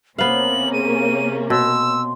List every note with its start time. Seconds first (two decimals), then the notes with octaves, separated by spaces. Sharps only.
0.18 C3 A#3 B3 C#4 C5 F5 F#7
0.72 G#4 D#7
1.50 B2 C6 E6